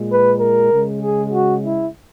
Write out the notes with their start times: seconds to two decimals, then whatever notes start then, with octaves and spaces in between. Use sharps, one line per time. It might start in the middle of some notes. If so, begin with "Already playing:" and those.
Already playing: A#2 G#3
0.10 B4
0.40 A#4
0.71 C#3 G#3
1.02 G#4
1.32 F#4
1.64 E4